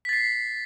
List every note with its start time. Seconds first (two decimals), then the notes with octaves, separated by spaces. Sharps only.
0.05 B6
0.09 A6
0.13 C7